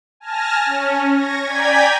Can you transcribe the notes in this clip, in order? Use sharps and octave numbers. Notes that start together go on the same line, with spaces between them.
G#5 A5 F6 A#6
C#4
C#6 G#6 A#6
D5 G5 G#5 A#5 G#6 B6